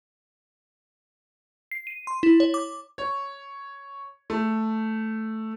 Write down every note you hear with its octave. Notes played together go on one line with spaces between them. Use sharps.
C7
D#7
C6
E4
C#5
D6
C#5
A3